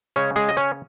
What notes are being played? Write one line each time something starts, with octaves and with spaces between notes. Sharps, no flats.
C#3 G#3 C#4 C#5
G#3 G#4
D#5
C#4 C#5